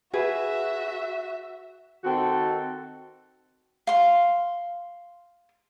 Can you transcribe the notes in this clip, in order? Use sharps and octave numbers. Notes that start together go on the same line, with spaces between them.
F#4 G#4 B4 E5
D#3 C4 F#4 A4
F5 C6